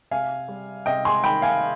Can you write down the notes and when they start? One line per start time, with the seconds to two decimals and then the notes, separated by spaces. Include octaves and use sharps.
0.11 C3 F5 G#5
0.48 G3
0.86 C3 D#5 G5
1.05 G#5 C6
1.24 D#3 G5 B5
1.42 F5 G#5